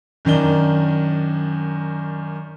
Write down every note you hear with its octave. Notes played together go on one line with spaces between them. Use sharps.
F#2 D#3 D4 G7